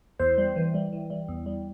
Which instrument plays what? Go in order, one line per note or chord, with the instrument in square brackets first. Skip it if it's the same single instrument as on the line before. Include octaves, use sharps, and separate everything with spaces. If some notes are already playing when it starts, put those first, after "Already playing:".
[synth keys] E2 C5
G3
E3
G3
E3
G3
E2
G3